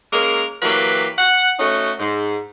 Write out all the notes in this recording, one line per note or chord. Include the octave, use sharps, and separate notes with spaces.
G#3 A#3 C#4 A#4
E3 F#3 A#3 G4 B4
F#5
A3 C#4 D#4 F#4
G#2